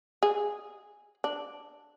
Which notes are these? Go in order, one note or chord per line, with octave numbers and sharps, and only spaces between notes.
G#4
D4